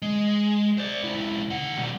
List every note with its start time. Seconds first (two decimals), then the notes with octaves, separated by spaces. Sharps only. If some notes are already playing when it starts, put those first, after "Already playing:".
0.02 G#3
0.78 C5 D5
1.04 C#2 E4
1.50 D#3 F#5
1.77 B2 G3